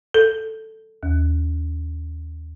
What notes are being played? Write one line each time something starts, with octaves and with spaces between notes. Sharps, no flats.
A4
D#2